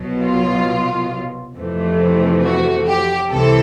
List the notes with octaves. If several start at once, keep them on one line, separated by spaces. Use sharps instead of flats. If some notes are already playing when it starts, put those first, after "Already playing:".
Already playing: C2 B2 F#3
F4
F2 C3 E3 A3
F#4
G4
C2 C3 E3 A4